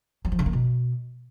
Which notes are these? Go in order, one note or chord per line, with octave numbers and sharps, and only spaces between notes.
F#3
F3
C#3
A#3
B2